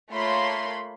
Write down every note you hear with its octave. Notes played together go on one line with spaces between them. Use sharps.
A3 A#3 F4 C#5 B5 C6